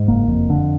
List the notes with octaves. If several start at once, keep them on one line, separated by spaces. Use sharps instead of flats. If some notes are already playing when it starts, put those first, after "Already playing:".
Already playing: G#2
F#1 A#3
F2
D3